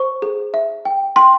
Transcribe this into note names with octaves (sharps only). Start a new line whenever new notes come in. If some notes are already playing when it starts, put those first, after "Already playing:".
Already playing: C5 C#6
G#4
E5
G5
G5 C6